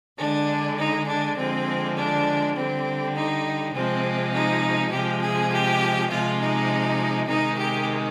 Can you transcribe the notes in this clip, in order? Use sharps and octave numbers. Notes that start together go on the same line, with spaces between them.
D3 G#3 D4
D#4
D4
D3 F3 G#3 C4
D4
D3 G3 C4
D#4
C3 F3 G#3 C4
D#4
C3 F3 G#3 G4
G#4
G4
C3 F3 G#3 F4
D#4
C3 D#3 G#3 D#4
G4